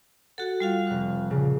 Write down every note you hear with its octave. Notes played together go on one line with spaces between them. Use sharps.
F#4 A4 F#5
G3 F4 F5
F1 F#6
A#2 C#3